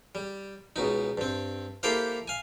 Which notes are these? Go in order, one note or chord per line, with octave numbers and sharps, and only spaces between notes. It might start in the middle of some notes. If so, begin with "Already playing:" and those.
G3
C#2 B2 D#4
G2 C4
A#3 E4 G4 A4 C5 F5
F5 G#5